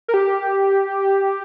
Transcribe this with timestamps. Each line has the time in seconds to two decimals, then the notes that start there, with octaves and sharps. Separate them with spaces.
0.08 A#4
0.14 G4